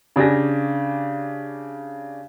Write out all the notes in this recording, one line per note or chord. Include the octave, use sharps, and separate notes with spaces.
C#3 D4 G4 G#5 A#6